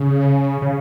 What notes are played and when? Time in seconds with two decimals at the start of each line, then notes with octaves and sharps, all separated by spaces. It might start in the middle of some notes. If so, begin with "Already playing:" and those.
Already playing: C#3
0.62 C#3